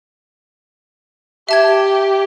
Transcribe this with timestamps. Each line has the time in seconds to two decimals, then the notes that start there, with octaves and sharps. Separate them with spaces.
1.49 G4 E5 A5 G#6